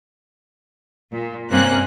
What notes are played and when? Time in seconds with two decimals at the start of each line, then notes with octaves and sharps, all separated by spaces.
1.13 A#2
1.51 G2 C3 A#3 C#4 F#6